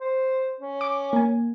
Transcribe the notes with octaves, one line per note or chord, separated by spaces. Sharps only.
C5
C#4
D6
A#3 G#5